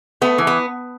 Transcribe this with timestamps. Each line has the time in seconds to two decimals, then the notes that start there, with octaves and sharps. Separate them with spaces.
0.21 A3 B3
0.38 E3
0.47 B3